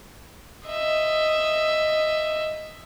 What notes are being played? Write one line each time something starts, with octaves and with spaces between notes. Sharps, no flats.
D#5 E5